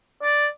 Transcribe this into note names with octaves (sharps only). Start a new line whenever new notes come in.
D5